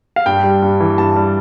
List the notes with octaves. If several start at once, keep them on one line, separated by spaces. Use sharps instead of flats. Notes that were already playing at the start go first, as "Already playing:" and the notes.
F5
G2 G5
G3
G2
E3
G2 A5
G3